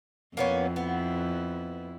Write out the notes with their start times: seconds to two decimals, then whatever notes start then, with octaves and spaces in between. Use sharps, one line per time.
0.37 F2 A#3 B3 C#4 E4
0.76 B3